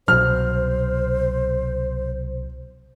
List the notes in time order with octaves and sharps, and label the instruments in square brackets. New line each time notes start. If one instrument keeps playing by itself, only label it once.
[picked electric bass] C2 B2 F#3 [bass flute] C5 [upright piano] F6